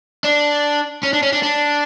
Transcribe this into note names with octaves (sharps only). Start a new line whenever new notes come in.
D4
C#4
D4
C#4
D4
D4